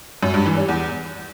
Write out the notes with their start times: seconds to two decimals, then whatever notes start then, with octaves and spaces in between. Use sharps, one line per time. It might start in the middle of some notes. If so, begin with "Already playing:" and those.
0.23 F#2
0.34 G2
0.45 E3
0.57 G3
0.68 E2